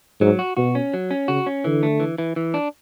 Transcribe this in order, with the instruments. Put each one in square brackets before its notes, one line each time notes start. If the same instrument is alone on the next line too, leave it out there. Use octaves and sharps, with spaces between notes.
[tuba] G#2 [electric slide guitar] F#3
[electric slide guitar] F#4
[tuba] B2 [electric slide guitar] F#4
[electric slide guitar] C#4
F#3
C#4
[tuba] C#3 [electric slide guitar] F#4
[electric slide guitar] C#4
[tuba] D3 [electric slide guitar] E3
[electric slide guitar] A3
E3
E3
E3
D4